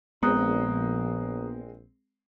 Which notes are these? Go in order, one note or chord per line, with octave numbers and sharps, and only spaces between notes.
A#1 G#3 B3 C4 A#5 D#6 F#6